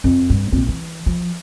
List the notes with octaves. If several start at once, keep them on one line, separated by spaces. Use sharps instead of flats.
F2
G2
A#1 C4
E3
F3